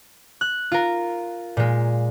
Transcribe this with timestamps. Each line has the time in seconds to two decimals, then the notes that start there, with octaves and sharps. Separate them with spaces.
0.41 F#6
0.72 F4 A#4
1.57 A#2 G#3